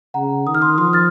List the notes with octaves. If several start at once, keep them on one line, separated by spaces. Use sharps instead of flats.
C#3 F#5 A#5
D#3 D#6
F6
C6 D#6
F3 C6 D#6
F6 A6